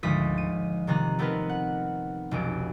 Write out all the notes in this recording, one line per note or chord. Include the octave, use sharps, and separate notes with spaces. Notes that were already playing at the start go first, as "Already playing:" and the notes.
G#1 D2 F3 G#3 D#6 B6
D#7
C3 D#3 G3 D#4 A#5 F#6
A3 B3 C4 D#4 A#4 B4
F#5
F1 B1 C#4 D7